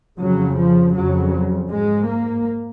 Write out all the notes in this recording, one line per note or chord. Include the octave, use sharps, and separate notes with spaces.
F2 C#3 F#3
F3
F2 C#3 F#3
G#2 G#3
A#3